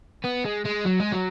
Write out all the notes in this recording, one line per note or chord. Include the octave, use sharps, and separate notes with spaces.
B3
G#3
G#3
F#3
G#3
F#3